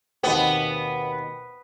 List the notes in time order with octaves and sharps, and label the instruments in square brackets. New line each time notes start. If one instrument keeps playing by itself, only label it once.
[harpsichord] D#2 B2 C4 [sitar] B3